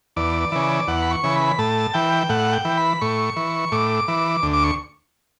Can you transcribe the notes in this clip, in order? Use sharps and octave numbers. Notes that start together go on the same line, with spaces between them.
E2 D5
C#3 E3
E2 F#5
B5
C#6
C#3 E3
B5
A2 A5
E3 G5
A2 F#5
G5
E3
B5
A2 C#6
E3
A2 D6
E3
D2
D6
C#6